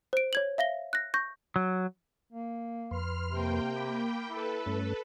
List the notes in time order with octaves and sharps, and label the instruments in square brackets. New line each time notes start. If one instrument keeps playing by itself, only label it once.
[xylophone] C5 D7
C#5 G#6 F#7
E5 F5 A#6 G7
F#6 A#6
C#6 G6 A#6
[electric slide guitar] F#3
[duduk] A#3
[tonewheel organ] F2 B4 C6 [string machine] F6
[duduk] C3 [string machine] A#3 G5
[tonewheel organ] B5 D6
[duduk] E4 [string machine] A4 B4
[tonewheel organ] G2 A3 C#4